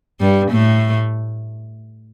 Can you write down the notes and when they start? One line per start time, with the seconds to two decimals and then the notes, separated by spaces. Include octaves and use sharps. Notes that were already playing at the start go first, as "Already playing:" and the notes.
0.20 G2 G3
0.51 A2 A3